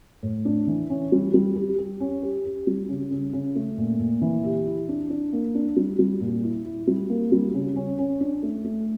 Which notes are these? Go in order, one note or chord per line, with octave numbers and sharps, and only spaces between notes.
A2
D4
E3
C#4
G3
G3
G4
G4
C#4
G4
G4
G3
C#3
C#3
C#3
A3
A#2
A#2
E3
G4
E4
D4
D4
A#3
D4
G3
G3
A#2
E4
E4
G3
A#3
G3
C#3
C#4
C#4
D4
A3
A3